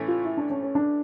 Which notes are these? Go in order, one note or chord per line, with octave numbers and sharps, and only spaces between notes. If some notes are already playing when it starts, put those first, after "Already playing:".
Already playing: A2 E3 A3 C#4
F4
E4
D4
C#4
C#4
D4